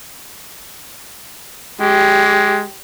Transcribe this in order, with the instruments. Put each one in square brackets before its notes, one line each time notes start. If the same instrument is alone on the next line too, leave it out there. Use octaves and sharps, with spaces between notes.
[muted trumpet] G#3 [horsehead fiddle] G4